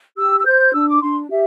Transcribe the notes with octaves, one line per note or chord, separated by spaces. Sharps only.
G4 E6
E6
C5 G6
D4 E6
D6
D4 C6
G4 E5